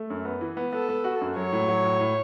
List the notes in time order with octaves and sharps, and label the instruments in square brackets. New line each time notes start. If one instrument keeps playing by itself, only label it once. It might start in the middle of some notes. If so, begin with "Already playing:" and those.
Already playing: [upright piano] A3
F#2
B3
E3
B3
[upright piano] B3 [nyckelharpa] A4
[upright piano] B3
F#4
F#2
[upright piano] F#3 [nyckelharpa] C#5
[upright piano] A2
F#3
A2
A2